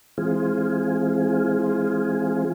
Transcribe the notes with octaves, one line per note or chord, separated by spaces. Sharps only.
E3 G#3 C4 F4 G#4